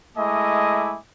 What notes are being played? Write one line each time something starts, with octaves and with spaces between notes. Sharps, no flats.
G#3 A3 E4 D#5 G#5 D6